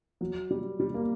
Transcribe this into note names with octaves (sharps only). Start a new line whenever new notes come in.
F#3
G3
G3
A#3